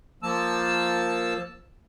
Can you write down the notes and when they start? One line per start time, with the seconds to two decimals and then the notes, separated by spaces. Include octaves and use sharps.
0.23 F3 A#3 A5 E6